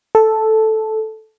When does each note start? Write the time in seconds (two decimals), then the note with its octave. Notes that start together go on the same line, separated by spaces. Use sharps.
0.15 A4